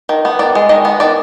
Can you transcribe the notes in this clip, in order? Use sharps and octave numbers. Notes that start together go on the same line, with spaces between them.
D#3
B3
D#3 D5
G#3
D#3 D#5
B3
D#3 D5